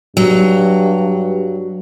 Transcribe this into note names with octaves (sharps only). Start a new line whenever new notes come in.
G2 F#3